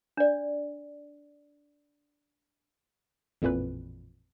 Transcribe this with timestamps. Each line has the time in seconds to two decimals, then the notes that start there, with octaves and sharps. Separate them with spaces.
0.17 D4 D5
3.42 A1 F2 A#2 E3 B4